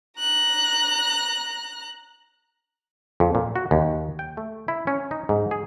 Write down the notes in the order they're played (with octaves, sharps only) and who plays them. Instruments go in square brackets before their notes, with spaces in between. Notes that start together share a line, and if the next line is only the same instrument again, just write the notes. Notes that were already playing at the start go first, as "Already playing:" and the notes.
[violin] A#5 F#6
[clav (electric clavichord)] F2
A#2
F#4
D#2
G5
A3
E4
C#4
D#4
G#2
G#4